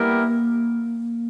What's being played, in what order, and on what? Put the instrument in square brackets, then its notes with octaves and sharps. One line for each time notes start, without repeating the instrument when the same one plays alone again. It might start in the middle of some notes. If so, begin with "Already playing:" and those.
Already playing: [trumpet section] G3 B3 E4 G4 A#4 [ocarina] A#3